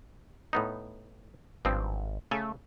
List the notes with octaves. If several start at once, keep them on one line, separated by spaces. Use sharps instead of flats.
A2 B3 D#4
G#1 G2 F3 C4
C#3 A3 A4 G#5